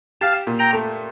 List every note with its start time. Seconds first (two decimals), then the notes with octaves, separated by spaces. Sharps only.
0.21 G4 F5 A5
0.47 A#2
0.59 G5 A#5
0.73 A3